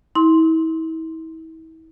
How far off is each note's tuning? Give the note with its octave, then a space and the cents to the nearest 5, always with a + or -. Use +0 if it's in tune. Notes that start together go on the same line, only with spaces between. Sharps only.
E4 -40 C6 +0